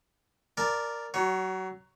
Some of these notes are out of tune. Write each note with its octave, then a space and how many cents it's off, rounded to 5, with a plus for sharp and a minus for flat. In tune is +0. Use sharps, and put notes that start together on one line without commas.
A#4 +0 D5 +0 A5 -15
F#3 +25 C#5 +0